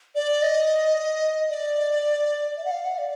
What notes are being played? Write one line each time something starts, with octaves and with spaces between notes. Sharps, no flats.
D5
D#5
D5
E5
F#5
F5
F#5
D5